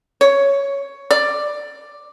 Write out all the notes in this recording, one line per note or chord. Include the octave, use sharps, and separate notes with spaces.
C#5
D5